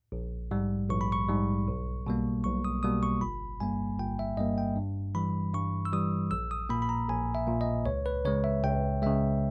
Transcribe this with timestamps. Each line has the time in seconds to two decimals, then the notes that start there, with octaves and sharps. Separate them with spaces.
0.12 A#1
0.51 G#2 G3
0.89 A#1 C#6
1.01 B5
1.12 C#6
1.28 G#2 G3
1.68 B1
2.07 B2 G3 A#3
2.44 B1 C#6
2.65 D#6
2.83 B2 G3 A#3 D#6
3.03 C#6
3.21 G1 B5
3.60 G2 G3 A#3 G#5
3.99 G1 G5
4.19 E5
4.37 G2 G3 A#3 D#5
4.58 G5
4.76 G2
5.15 E3 G3 B5
5.54 G2 C#6
5.85 E6
5.93 E3 G3 D#6
6.31 A#1 E6
6.51 D#6
6.70 A#2 A#3 B5
6.82 B5
6.89 A#5
7.08 A#1 G#5
7.35 E5
7.47 A#2 A#3
7.61 D#5
7.86 C#2 C#5
8.06 B4
8.25 C#3 G#3 C#5
8.44 E5
8.63 C#2 G5
9.02 C#3 G#3 E5